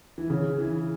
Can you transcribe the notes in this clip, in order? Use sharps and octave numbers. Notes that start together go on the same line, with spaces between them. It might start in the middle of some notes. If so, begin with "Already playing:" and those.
E3
C#3
E3